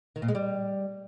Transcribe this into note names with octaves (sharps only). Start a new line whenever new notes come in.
D#3
A#2
G#3
G3